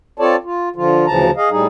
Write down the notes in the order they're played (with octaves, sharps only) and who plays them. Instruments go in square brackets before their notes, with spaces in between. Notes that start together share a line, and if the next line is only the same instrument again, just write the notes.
[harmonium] C4 F4 A4 C#5 D5 A5
F4
D3 F3 F4
D2 C#3 E3 F3 A5 A#5
G#4 D#5 F5
A2 G3 D#4 G#4